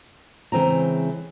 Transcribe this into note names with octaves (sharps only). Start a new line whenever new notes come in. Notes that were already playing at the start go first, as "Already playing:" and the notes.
C#3 E3 G#3 C4 A#5